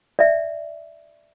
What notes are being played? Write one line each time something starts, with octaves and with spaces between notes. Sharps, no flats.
D5 E5